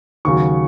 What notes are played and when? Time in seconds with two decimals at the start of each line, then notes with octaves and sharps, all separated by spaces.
0.25 D#2 C#3 F#3 C#6